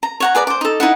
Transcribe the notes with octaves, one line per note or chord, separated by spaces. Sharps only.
A#5
C#5 F#5 A#5
G#4 B4 D5 A#5
C5 D6
D#4 A4
D#4 E4 F#5